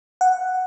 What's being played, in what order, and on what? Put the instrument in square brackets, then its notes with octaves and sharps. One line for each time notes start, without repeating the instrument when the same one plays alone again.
[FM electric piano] F#5